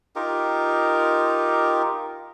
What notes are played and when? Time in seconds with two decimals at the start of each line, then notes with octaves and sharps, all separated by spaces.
0.16 D#4 F4 G4 A#4